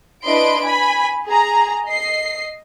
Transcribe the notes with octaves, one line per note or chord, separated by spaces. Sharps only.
D4 E4 B4 D#5 C6 D7
G#5 B5
G#4 A#5
D#5 C7